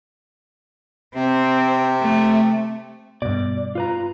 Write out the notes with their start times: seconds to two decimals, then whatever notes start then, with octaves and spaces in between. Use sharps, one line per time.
1.15 C3 C4
2.00 A3
3.22 G2 B2 D5
3.75 F4 B4 A#5